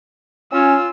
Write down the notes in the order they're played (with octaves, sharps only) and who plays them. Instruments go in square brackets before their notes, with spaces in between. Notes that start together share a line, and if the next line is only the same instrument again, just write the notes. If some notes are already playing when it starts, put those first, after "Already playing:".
[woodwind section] C#4 [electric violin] F4 E6